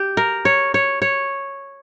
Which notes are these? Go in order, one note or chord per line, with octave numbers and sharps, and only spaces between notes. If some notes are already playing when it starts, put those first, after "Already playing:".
Already playing: G4
A#4
C#5
C#5
C#5